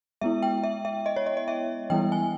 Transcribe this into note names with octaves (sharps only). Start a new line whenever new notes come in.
G#3 B3 E4 E5
G5
E5
E5
D#5
C#5
D#5
D#5
E5
E3 G3 B3 E4 G5
G#5